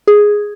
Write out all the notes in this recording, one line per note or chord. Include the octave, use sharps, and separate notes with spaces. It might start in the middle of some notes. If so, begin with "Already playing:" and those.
G#4